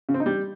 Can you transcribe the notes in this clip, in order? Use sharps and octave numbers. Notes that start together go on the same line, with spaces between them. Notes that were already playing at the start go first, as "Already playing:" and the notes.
C#3
C4
D#4
G3